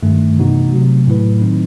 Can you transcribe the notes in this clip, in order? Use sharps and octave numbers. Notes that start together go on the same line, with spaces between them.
G2 D#3 A3
C3 E3 B3 D#4 F#4
C3 F#3 A3
A2 F#3 A3 E4 B4
D#3 F#3 C4 D#4